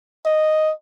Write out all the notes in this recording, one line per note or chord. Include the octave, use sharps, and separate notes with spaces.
D#5